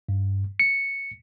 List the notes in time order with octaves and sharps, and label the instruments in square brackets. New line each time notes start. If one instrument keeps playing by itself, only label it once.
[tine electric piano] G2
C#7